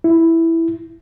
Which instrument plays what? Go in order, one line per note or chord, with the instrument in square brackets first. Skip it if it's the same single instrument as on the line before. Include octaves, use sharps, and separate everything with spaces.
[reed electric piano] E4